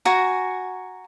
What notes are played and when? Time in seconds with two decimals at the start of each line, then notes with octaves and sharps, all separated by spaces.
0.05 F#4 G#5 A#5